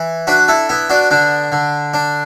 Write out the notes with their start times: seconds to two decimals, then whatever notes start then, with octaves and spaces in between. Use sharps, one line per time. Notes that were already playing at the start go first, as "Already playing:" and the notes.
Already playing: E3
0.27 D4 F#4 B4
0.48 E4 A4
0.69 B3 E4
0.89 D4 F#4
1.11 D3 D4
1.52 D3
1.94 D4